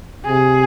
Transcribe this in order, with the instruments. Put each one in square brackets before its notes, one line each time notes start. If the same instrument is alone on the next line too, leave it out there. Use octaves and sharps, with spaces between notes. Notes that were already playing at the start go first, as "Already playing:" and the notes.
[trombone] C3 [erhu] G#4